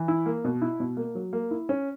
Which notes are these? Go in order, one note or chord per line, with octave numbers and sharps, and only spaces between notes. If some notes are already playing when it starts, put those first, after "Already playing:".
Already playing: E3
E4
A#3
B2
E4
B2
A#3
F#3
A#3
E4
C#4